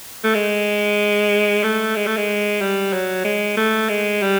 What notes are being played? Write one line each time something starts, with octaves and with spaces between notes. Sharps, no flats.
A3
G#3
A3
G#3
A3
G#3
G3
F#3
G#3
A3
G#3
G3